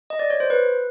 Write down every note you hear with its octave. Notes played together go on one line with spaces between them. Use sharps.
D#5
D5
C#5
C5
B4